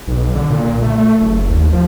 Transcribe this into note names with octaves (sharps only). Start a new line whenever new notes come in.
B1
D3
A#2
A3
A3
F#1
D#2
F3